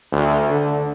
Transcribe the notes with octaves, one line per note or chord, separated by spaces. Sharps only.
D2
D3